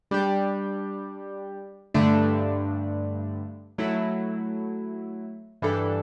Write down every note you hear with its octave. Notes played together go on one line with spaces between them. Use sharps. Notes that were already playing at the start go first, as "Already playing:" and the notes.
G3 D4 G4
G2 D3 A3 D4
F#3 A3 E4
G2 E3 G3 D4 A4